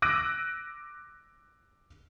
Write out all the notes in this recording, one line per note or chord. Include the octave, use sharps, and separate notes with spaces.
D6 E6 F#6 A#6 D7 D#7